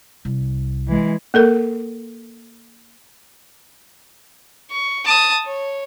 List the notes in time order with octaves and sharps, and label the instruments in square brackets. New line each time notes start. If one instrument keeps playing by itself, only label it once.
[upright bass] C2
[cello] E3 G#3
[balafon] A#3 A4 A#4
[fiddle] C#6
A5 D#6
C#5